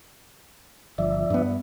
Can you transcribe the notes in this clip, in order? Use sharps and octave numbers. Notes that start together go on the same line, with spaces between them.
G1 F3 D5 E5
G2 B3